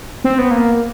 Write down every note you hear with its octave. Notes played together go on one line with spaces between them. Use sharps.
C4
B3
A#3